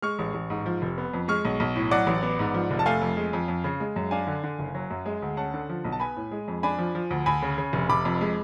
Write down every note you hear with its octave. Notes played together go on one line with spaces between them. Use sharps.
G#3 C#6 F6
A1
A1
G#2
F3
F1
B3
F2
G#3 C#6 F6
B1
B1
A2
F#3 D5 F#5
A1
B3
G#2
F3
F1
A5
A3 F5 G#5
F2
G#3
F2
F2
C#3
G#3
F#2
D4 F5 G#5
D3
D3
F#1
F#3
F#2
G#3
D2
C#4 F#5 A5
D3
F3
B1
A5
B3 G#5 B5
A2
G#3
F2
D4 G#5 B5
F3
F3
D2
D2 G#5 B5
C#3
C#3
F1
F1 B5 D6
F2
G#3